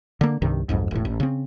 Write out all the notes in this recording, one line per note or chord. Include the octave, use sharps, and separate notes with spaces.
D3 A#3
C2 G2 C3 D#3
B1 F2 G#2
E1 A2
A1
C#3 C4